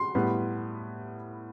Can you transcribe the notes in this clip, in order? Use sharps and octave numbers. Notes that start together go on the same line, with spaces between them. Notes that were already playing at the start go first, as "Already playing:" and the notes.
Already playing: C6
A2 G3 B3